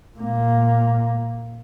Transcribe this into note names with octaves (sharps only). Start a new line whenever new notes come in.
A#2 A#3